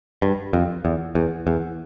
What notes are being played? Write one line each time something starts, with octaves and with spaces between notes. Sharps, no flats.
G2
F2
E2
E2
E2